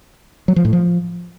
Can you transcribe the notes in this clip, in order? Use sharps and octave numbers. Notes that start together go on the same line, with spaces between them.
F#3
F3
A2
F3